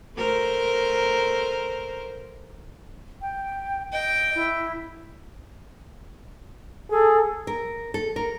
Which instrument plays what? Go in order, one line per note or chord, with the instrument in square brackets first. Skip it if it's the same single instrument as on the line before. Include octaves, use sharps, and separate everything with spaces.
[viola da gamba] A3 A#4 C5
[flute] G5
[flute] D#5 [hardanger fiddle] G5
[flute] E4
[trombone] G#4 [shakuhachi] A4
[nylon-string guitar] A#4
A4
A#4